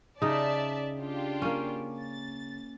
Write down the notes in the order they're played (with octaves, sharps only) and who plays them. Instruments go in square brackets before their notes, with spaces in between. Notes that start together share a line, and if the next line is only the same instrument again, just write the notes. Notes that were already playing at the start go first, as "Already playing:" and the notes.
[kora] C#3 D#4 [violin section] D5 E5 A5
[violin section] D4 F4 G4
[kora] A#3 C#4
[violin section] A6